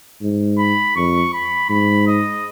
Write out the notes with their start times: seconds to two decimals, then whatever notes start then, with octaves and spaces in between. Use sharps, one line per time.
0.22 G#2
0.59 B5
0.96 F2 C#6
1.33 B5
1.69 G#2 B5
2.07 D#5